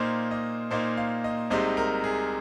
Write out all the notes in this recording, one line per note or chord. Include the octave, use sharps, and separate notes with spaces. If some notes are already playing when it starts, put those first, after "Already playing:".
Already playing: A#2 A#3 D#4 C5
D#5
A#2 A#3 D#4 C5
F5
D#5
C2 C3 G#3 D#4 C5
A#4
G#4